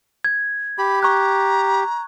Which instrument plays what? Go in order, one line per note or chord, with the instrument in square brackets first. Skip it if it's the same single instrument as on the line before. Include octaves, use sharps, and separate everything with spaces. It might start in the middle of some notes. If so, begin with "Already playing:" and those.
[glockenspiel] G#6
[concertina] G4 [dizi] B5
[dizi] A#5 [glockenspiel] C#6 F#6